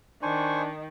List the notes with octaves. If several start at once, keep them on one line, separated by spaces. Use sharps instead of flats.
D#3 D4 C5 G#5 C#6